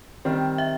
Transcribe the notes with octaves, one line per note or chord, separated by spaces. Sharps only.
D#3 G3 C4
E5